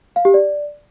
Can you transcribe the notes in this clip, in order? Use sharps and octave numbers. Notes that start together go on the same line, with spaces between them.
F5
G4
D5